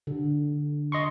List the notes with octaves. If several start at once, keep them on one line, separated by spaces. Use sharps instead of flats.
D3
D#5 C6 C#6